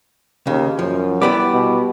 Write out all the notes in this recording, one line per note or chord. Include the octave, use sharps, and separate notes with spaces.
D#2 C#3
F#2 F3
G3 B3 E4 G4 B5 D6
B2